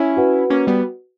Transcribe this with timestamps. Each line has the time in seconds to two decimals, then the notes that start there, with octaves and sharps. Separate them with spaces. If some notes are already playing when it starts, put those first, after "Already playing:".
Already playing: C#4 E4
0.16 F#4 B4 F#5
0.50 A#3 C#4
0.67 G3 B3